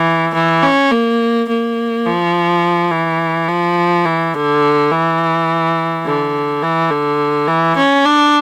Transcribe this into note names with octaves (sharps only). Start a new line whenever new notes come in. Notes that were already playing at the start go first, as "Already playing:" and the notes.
Already playing: E3
E3
C#4
A#3
A#3
F3
E3
F3
E3
D3
E3
D3
E3
D3
E3
C#4
D4